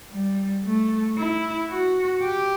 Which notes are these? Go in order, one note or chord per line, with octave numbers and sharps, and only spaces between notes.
G3
A3
E4
F#4
G4